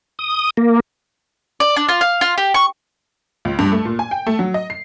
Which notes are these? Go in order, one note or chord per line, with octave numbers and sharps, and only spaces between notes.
D#6
A#3
D5
D4
F4
F5
F4
G4
C#6
C#2
G2
A3
A#2
G#5
G5
A3
F#3
D#5
C7